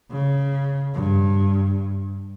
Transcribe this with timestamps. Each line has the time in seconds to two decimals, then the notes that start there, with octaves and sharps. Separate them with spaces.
0.11 C#3
0.94 G2